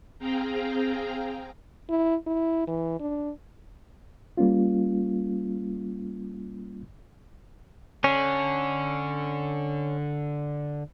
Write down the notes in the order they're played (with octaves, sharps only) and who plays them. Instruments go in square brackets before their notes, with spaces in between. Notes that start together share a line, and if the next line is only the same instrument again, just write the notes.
[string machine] C4 G#4 F5 G5 A#5
[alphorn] E4
E4
E3
D4
[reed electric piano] G3 A#3 C#4 F4
[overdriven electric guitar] D3 [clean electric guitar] C#4